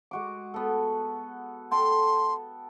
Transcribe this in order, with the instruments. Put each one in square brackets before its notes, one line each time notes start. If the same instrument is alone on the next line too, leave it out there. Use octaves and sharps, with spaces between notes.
[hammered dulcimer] G#3 F#4 D6
B3 A4
[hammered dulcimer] A4 G5 A5 [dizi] C6